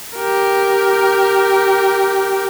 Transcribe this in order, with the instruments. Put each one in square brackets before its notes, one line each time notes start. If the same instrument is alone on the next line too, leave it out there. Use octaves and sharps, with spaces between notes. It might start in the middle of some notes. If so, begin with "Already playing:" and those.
[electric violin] G4 A#4